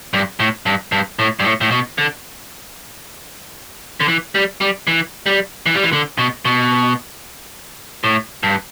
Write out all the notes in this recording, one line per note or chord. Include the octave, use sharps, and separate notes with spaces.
G2
A2
G2
G2
A2
G2
A2
A2
B2
D3
D3
E3
G3
G3
E3
G3
E3
G3
E3
D3
B2
B2
A2
G2